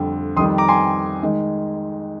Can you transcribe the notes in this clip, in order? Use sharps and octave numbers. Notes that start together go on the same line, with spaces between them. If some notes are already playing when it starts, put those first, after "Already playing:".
Already playing: F2 D3 G3
F2 D#3 G3 C6 D#6
A#5 D6
G#5 C6
D#3 G#3